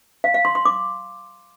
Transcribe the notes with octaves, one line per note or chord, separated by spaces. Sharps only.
F5
F5
C6
C6
D6